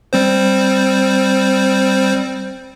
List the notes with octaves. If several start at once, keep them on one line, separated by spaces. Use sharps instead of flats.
G3 C4 C5